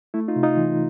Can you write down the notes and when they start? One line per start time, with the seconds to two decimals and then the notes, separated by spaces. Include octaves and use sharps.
0.14 A3 E4
0.28 D#4 F4
0.36 C3
0.43 D#4 F4
0.57 E3